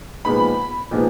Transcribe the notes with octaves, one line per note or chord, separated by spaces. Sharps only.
A#2 F3 G#3 B3 D#4 B5
A#2 F3 G#3 B3 D#4